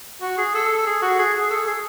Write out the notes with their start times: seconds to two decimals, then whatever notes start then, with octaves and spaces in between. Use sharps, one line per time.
0.22 F#4
0.38 G#4
0.55 A4
0.87 G#4
1.02 F#4
1.19 G#4
1.41 G#4
1.51 A4
1.67 G#4